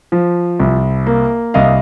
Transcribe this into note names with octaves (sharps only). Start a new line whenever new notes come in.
F3
C2
A#3
C2 D#5 F5